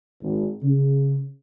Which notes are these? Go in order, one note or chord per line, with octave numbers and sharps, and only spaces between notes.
G#1
C#3